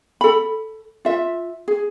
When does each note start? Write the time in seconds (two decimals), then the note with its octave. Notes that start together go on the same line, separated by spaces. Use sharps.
0.21 A4 B5
1.05 F4 E5
1.68 G#4